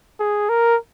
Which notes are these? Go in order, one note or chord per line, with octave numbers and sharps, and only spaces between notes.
G#4
A#4